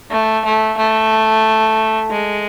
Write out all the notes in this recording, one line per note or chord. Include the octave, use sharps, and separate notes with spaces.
A3
A3
A3
G#3